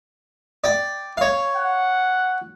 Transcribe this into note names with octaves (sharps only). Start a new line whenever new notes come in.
D5 G5
C#5 F5
F#5